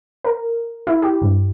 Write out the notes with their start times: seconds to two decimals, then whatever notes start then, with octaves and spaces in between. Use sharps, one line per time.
0.24 A#4
0.87 E4
1.02 G4
1.22 G2